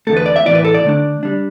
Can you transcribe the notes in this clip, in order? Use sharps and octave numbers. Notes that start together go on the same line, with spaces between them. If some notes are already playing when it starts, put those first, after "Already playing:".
E2 D3 A3 A4
B4
D5
E5
A2 E3 B3 E4 D5
B4
A4
D5
D3 A3 D4
G3 D4